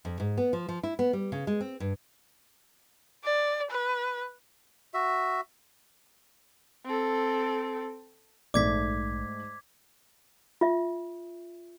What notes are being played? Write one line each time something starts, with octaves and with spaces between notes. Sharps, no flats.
F2
G#2
B3
F3
F3
E4
B3
G3
C#3
G#3
C4
G2
D5
B4
F#4 E5
C4 A4
A#1 G#2 A3 D5 D6 G#6 B6
F4 E5